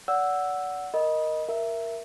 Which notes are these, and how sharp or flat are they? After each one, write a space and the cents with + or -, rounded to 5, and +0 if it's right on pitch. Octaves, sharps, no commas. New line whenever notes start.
D5 -35 F#5 +0 E6 +0
A#4 +0 D#5 +0 B5 -25
A#4 +0 E5 +15